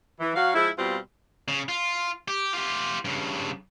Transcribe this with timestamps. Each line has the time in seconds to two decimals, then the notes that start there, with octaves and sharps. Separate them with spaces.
0.20 E3
0.34 F#3 F#4 F5
0.54 F3 G#3 E4
0.77 B2 G3 C4 F4
1.48 C#3
1.69 F4
2.28 G4
2.53 F4 G4
3.05 G2 C#3